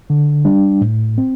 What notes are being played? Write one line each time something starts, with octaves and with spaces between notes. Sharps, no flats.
D3
G3 D4
A2
C4